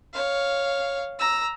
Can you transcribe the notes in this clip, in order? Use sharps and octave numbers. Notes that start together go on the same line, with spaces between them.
C#5 F5
A#5 E6